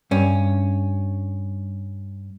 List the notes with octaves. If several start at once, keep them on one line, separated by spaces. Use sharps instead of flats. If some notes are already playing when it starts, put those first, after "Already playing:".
G2 C#4